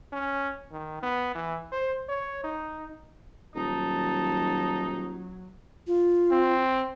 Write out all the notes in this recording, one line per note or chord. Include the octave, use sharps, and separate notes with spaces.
C#4
D#3
B3
E3
C5
C#5
D#4
D#1 F#3 D#4 A5
F4
C4